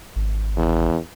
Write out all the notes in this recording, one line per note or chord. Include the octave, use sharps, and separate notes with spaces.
G#1
E2